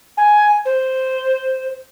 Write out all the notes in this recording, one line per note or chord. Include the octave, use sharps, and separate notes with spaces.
G#5
C5